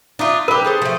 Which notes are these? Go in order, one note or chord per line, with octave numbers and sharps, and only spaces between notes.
D4 D#4 F4 E5
G4 A#4 B4
G#4 A4 C5
F3 A3